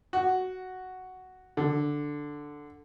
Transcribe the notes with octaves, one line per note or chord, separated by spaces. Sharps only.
F#4
D3